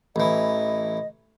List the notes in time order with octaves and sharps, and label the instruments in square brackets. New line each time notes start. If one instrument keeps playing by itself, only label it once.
[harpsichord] A1 E3 [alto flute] D#5